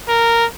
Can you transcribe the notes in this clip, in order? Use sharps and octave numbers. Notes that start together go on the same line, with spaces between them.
A#4